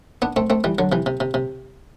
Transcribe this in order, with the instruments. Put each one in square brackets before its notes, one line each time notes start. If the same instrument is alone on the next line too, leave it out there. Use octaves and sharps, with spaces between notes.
[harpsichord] B3 D4
A3 C4
A3 C4
E3 G3
D3 F#3
C3 E3
C3
C3
C3